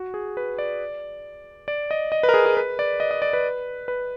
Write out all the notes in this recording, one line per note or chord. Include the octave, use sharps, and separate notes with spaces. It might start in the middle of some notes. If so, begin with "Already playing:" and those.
Already playing: F#4
G#4
B4
D5
D5
D#5
D#5
B4
A#4
G#4
G#4
B4
D5
D#5
D#5
D5
B4
B4